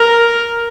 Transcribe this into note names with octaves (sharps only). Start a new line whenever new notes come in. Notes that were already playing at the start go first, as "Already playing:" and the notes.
Already playing: A#4